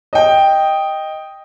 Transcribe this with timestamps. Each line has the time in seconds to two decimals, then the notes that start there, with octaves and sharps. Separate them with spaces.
0.13 D#5 G5